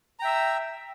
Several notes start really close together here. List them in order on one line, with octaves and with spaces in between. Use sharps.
A#5 G5 E5 E6